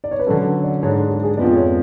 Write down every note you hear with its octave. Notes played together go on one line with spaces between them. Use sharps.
D5
C#5
B4
D3 F#3 C#4 A4
D5
G#2 G#3 D4 C#5
A4
G#4
G#4
F2 F3 G#3 B3 D5
C#5